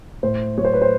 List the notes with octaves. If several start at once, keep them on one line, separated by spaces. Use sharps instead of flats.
A2 C5
F#3 C#5
C5
B4
C5